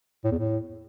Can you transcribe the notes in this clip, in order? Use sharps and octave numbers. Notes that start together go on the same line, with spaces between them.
A2
E2
A2